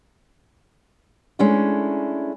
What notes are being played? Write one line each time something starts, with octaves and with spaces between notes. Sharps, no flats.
G#3 A3 C#4 D4 E4